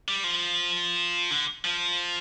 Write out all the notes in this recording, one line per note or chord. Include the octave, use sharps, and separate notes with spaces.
G3
F3
D3
F3